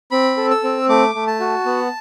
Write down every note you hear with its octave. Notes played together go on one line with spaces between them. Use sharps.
C4 B5
A4
E6
C4
A3 D6
A3
A5
F#4
B3